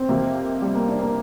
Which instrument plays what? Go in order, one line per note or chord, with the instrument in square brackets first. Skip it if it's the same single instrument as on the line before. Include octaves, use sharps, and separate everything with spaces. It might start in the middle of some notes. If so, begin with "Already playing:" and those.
Already playing: [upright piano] C4
[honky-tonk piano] F2 C3 A#3
[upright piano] G3
A#3
D4
A#3